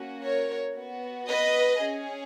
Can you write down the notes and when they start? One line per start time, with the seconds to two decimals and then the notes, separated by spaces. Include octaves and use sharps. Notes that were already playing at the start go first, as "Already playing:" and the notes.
Already playing: A#3 C#4 F#4
0.23 A#4 C#5
0.76 B3 F#4
1.28 B4 D#5
1.81 C#4 G#4